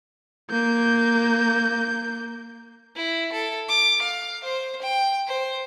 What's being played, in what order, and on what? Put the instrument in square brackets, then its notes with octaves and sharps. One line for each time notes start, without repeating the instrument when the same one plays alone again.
[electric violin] A#3 G6
[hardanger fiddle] E4
A4
D6
F5
C5
G5
C5